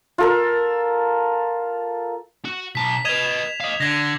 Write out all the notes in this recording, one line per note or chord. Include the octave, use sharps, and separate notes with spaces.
F4 A4 A#4
F#4
B1 A5 B6
B4 D#5 G#6 E7 F7
E7
D#5 F5
D3 G#6 A#6